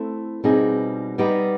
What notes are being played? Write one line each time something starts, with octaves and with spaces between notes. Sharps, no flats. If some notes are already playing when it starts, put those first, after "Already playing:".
Already playing: A3 C4 E4
B2 G3 C4 D#4 G#4
G3 B3 D#4 G4